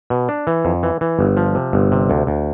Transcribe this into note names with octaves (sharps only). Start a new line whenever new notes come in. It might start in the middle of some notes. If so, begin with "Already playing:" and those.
B2
D4
E3
F2
E3
E3
G1
F3
C3
G1
C3
D2
D2